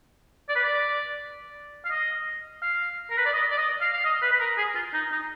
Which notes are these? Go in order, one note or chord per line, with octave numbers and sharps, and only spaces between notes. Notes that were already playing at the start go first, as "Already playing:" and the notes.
D5
B4
D5
F5
D#5
F5
A#4
B4
D5
D#5
D5
D#5
F5
F5
D#5
B4
B4
A#4
G#4
F4
D#4
D#4